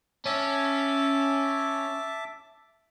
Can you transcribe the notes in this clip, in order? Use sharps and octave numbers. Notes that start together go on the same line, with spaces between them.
C#4 E5 A5 D6